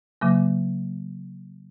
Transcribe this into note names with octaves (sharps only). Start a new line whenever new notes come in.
C#3 F#3 A#3